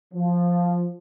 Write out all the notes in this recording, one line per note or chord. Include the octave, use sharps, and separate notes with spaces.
F3